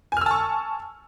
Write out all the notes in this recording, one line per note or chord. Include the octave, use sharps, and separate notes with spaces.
G#5 A5 C#6 E6 F6